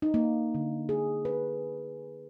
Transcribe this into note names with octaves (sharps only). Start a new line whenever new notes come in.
D#4
A#3
D3
G#4
B4